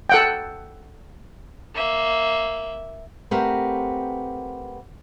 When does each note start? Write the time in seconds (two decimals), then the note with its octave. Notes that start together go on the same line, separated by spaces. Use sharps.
0.09 A4 F#5 G5
1.75 A#3 E5
3.31 A3 C4 G4 A#4 B4 F#5